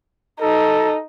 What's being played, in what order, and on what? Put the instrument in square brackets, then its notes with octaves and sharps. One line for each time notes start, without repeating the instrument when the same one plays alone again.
[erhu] D#4 [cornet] A4